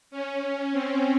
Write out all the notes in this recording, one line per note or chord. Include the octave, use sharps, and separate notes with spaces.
C#4
C4